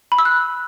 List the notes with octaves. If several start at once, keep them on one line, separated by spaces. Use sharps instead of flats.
B5
E6
F#6